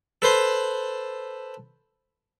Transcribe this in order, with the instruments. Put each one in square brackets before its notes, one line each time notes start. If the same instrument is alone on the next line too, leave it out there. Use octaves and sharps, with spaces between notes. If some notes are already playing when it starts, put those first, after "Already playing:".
[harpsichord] A4 B4 C5 C6